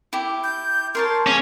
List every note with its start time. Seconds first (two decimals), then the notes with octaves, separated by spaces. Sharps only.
0.13 E4 G4
0.44 G6
0.95 A#4 C#5 A5 C6
1.27 C#4 G#4 F5